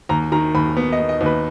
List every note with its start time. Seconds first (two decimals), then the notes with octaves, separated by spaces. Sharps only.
0.09 D#2 A#5
0.32 D#3 A#5
0.55 D#2 B5
0.77 B3
0.92 D#5
0.99 B3
1.09 D#5
1.21 D#2
1.26 B4